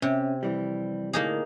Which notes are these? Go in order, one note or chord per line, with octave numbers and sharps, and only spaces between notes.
C3 C#4
F2 E3 G3
D2 A2 A#3 D#4 G#4